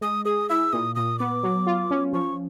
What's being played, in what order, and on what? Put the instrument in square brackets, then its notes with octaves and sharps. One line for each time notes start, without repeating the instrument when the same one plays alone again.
[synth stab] G#3 [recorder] D#6
[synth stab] G#4 [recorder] D#6
[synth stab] E4 [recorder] E6
[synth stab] A#2 [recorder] D#6
[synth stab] A#2 [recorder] D#6
[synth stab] B3 [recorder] D6
[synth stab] F#3
F4
C#4
[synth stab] F3 [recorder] C#6